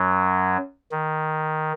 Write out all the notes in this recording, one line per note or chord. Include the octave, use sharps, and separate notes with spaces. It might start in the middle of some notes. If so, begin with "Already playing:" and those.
Already playing: F#2 F#3
D#3